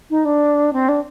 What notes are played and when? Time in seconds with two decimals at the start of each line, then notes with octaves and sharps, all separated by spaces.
0.10 D#4
0.25 D4
0.73 C4
0.89 D4